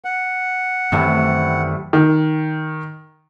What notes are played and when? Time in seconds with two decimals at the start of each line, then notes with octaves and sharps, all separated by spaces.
0.05 F#5
0.92 F#2 C3 D#3 E3 G3 A3
1.93 D#3